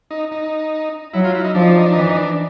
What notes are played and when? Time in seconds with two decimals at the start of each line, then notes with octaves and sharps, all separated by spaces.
0.11 D#4
0.32 D#4
1.13 F#3 E4
1.24 F4
1.35 E4
1.44 D#4
1.55 F3 D4
1.62 D#4
1.69 D4
1.78 D#4
1.86 D4
1.92 D#4
1.95 E3
2.00 D4
2.09 D#4
2.15 D4